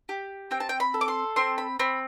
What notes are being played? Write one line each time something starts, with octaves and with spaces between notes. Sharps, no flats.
G4
C4 G5
A5
G5
B5
A4
D6
C6
C4 C6
B5
C4 B5